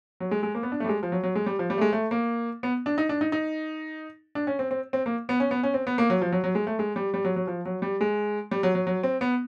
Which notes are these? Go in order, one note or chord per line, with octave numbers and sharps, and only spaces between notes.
F#3
G#3
G#3
A#3
B3
D4
A3
G3
G#3
F3
F#3
F#3
G#3
G3
F3
G3
A3
G#3
A3
A#3
B3
D4
D#4
D4
D#4
D#4
D4
C#4
C4
C4
C4
A#3
B3
C#4
B3
C#4
C4
B3
A#3
F#3
F3
F#3
F#3
G#3
A3
G#3
G3
G3
F#3
F#3
F3
F#3
G3
G#3
G3
F#3
F#3
F#3
C4
B3